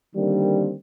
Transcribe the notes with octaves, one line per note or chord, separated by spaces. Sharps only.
D3 D#3 G3 A#3 C4 D4